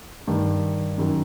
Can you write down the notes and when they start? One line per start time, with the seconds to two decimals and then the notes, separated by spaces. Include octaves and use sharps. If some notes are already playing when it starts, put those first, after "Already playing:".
0.27 G2 D#3
0.98 F#2 D#3